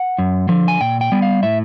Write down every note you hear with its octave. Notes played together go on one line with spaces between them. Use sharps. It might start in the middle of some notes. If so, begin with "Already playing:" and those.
Already playing: F#5
F#2
D3 F3
G#5
A#2 G5
G5
G3 B3
F5
A2 E5